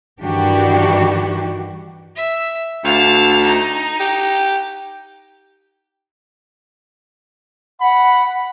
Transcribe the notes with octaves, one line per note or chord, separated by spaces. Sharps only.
G2 D#3 E3 D4 F#4 G4
E5
D2 F5 A5
D#4
G4
F#5 B5